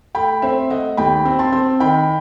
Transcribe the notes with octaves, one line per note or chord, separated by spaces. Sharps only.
A3 G5 B5
C4 C5 E5
A3 D#5 F#5
D#2 G5 B5
C4
A5 C6
C4
D#3 G5 B5